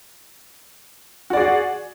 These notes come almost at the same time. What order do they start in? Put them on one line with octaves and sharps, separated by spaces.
F#4 D5 G#4